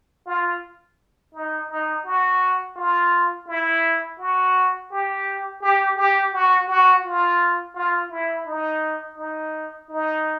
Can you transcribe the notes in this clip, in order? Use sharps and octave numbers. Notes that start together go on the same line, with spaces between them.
F4
D#4
D#4
F#4
F4
E4
F#4
G4
G4
G4
F#4
F#4
F4
F4
E4
D#4
D#4
D#4